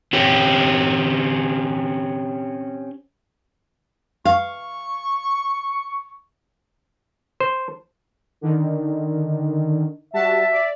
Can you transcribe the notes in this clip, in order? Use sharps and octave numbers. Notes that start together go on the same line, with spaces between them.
C4 C#4 G4
F5 C#6
C5
D3 D#3
G3 F#4 E5 A5
D5